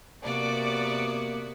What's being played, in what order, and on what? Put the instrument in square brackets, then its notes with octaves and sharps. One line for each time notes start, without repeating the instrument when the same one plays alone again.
[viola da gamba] C3 B3 F#4 [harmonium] A#3 [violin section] D5 D6